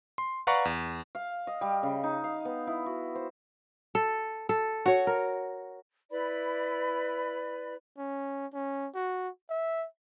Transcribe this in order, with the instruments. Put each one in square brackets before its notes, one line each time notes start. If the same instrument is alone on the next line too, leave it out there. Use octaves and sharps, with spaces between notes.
[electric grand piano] C6
B4 D5 F5 F#5 A#5 C#6
E2
[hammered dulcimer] F5
D#5
G3
C#3
D#4
F5
B3
E4
F#4
C5
[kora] A4
A4
F#4 C#5
A#4
[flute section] E4 B4 D5 B5
[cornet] C#4
C#4
F#4
E5